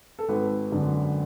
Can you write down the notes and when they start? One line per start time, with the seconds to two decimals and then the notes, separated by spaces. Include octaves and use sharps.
0.19 A4
0.29 G#1 B4
0.72 F#2 D3